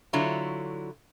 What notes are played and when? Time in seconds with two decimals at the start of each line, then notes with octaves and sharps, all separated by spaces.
0.13 D3 F#3 E4 F4 C#5